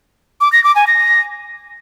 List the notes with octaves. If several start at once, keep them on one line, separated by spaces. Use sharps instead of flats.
D6
A#6
D6
G#5
A#6